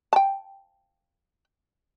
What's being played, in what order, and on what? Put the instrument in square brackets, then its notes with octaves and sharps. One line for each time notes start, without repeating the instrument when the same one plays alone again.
[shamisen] G5 A5